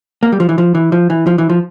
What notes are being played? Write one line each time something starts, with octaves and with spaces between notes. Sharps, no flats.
A#3
G3
F3
E3
F3
E3
F3
E3
F3
E3
F3